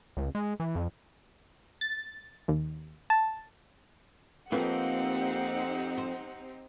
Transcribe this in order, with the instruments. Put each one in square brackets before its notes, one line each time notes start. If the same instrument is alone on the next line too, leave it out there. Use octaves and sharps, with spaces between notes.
[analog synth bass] C#2
G#3
E3
F2
[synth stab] A6
D#2
A5
[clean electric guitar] F2 [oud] A#3 B4 [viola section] C4 D#4 G4 [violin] F#5
[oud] C5